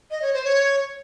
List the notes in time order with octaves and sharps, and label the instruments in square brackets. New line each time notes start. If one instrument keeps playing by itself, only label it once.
[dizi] D#5
C#5
C5
C#5